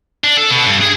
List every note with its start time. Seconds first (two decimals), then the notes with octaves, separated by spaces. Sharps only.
0.24 D4
0.37 A4
0.51 B2
0.66 G2
0.81 G#4